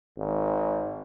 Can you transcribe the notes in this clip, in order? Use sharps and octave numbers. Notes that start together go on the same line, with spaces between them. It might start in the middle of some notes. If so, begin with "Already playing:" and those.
G#1